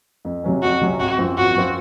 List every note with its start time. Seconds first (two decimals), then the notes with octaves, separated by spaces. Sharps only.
0.25 F2
0.44 C3 F#3 C#4
0.62 F2 F#4
0.81 C3 F#3 C#4
1.00 G#1 F#4
1.18 F#2 F3 C4 F4
1.38 G#1 F#4
1.56 F#2 F3 C4 F4